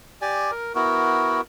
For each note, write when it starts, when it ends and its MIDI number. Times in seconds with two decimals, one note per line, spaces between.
0.22 0.51 67
0.22 0.51 74
0.22 0.51 80
0.51 0.73 70
0.75 1.41 59
0.75 1.41 64
0.75 1.41 66
0.75 1.41 70